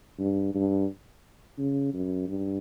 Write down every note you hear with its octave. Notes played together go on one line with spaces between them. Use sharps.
G2
G2
C#3
F#2
G2